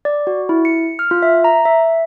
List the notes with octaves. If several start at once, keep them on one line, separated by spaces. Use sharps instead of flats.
D5
F#4
E4
C#7
F6
F4
E5
A#5
E5